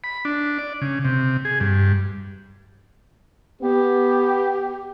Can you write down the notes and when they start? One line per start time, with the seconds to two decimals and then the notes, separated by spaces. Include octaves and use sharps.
0.04 B5
0.25 D4
0.59 D5
0.81 C#3
1.05 C3
1.45 G#4
1.60 G2
3.61 B3 G4